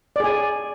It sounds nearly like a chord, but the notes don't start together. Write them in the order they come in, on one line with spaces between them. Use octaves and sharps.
D5 G#4 G#5